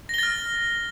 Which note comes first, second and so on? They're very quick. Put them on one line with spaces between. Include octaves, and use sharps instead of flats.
A#6 G7 A6 F6